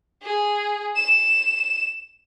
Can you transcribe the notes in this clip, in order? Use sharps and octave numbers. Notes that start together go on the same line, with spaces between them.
G#4
E7